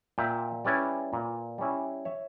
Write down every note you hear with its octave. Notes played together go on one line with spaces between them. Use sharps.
A#2 E5 G5
G3 C#4 E4 B4 D5
A#2
G3 C#4 E4
C#5 E5